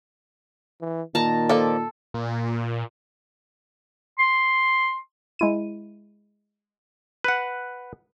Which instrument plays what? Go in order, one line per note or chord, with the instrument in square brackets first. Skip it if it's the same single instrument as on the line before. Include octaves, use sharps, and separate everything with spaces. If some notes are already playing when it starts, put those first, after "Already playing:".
[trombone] E3
[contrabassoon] A#2 [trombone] D#3 [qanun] A5 A#5
[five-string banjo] F3 A#3 D5 [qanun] A4
[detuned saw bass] A#2
[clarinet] C6
[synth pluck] G#3 E4 D#7
[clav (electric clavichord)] B4 F#5